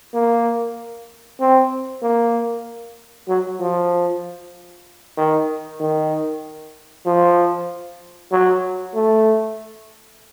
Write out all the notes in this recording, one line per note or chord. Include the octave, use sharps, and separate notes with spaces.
A#3
C4
A#3
F#3
F3
D#3
D#3
F3
F#3
A3